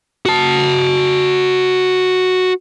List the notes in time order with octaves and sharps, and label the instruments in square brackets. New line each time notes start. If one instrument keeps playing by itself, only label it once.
[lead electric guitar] F#4 A5